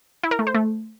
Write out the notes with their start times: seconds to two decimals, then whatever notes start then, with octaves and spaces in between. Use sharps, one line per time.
0.23 E4
0.31 A#4
0.39 A3
0.47 C5
0.54 A3